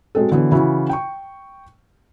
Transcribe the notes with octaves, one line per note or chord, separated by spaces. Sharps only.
B2 F#3 G#3 C4 A4
D3 E3 F#3 B3
C#3 E3 E4 F#4
G5 C#6